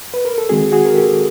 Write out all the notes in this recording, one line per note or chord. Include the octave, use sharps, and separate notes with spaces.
B4
A#4
A4
D#3 G#3 C4 F#4 G#4
F#4 G#4
A#4
G4 A4